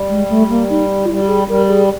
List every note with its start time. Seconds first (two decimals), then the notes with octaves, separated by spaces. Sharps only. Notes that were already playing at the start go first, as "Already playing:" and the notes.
Already playing: G3
0.10 G#3
0.30 A3
0.50 A#3
0.70 D#4
1.05 F4
1.09 G3 E4
1.22 G4
1.28 G#4
1.48 G3 A#4
1.69 G#4